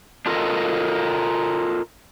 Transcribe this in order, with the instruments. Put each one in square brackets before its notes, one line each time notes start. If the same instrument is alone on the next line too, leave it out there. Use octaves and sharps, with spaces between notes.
[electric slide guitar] D4 F4 A4 A#4 D#5